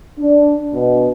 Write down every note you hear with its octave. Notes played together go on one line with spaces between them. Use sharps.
D4
B2